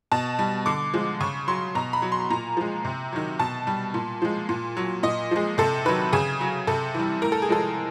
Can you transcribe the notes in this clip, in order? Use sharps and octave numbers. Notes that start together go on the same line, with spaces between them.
B2 A5
G3
D3 D6
F3 G#3
C#3 C#6
F#3 C6
B2 A#5
B5
F#3
C6
A#2 A#5
F3 G#3
C3
D#3 F#3
B2 A5
G3
A#2
F3 G#3
A#2
F#3
A#2 D#5
F3 G#3
C3 A4
D#3 F#3 B4
C#3 G#4
F#3
C3 A4
E3 G3
A2 A#4
A4
G#4
F3 G#3 A4